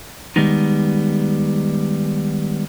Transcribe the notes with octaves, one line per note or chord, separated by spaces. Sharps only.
D#3 G3 G#3 B3 D#4